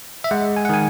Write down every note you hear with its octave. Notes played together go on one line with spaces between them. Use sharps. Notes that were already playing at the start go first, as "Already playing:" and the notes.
E5
G#3 F#5
G#5
F#5
D#3 G#5